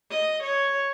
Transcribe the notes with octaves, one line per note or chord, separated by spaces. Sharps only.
D#5
C#5